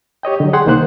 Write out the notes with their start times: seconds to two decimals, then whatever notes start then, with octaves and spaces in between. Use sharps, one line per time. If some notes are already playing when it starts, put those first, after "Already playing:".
0.23 G4 C#5 D#5 G5
0.40 D3 F#3
0.53 G#4 F#5 G5 C6
0.66 C2 D#3 A#3 C5 F#6